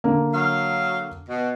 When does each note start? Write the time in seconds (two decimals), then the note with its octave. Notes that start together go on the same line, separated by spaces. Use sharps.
0.04 D3 A#3
0.33 F#3 F5
1.29 B2